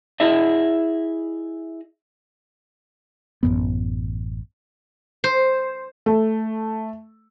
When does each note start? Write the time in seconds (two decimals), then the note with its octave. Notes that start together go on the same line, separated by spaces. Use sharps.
0.20 E4 G#4 D#5 E5
3.43 A1 F#2 A#2 B3
5.24 C5
6.06 A3